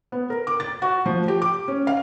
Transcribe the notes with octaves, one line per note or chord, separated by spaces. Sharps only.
B3
A#4
D6
A6
F#4
F3
G4
D6
C#4
F5